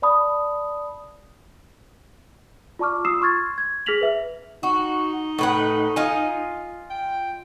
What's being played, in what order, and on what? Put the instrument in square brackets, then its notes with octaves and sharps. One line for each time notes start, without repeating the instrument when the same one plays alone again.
[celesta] D5 A5 B5 D#6
F4 D5 A5 C#6 D6 F6
F4 D#6 E6 C7 E7
C6 C#6 F6 G#6 A6
G#6
G#4 F6 A#6 B6 F7 F#7
B4 E5
[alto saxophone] D#4 [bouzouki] F#4
[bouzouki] A2 B4 F#5
F4 D#5 G#5
[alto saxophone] G5